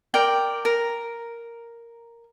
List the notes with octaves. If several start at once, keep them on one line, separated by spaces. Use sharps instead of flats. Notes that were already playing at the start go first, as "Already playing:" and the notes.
A#4 D5 G5
A#4